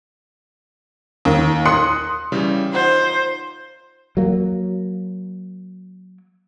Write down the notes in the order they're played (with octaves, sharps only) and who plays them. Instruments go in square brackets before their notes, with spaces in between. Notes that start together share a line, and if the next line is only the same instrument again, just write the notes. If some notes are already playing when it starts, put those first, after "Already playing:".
[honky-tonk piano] D#2
C6 D#6 F#6 C#7
[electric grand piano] C#3 E3 G3
[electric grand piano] D#4 F4 F#5 [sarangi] C5
[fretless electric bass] F#3 A#3